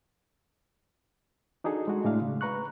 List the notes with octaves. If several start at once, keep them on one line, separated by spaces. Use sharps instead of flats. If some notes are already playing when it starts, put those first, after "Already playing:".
D4 D#4 F#4 G#4 A4
G#3 F#4
A2 G#3 A3 D4 F5
C#3
B4 A#5 C#6 F#6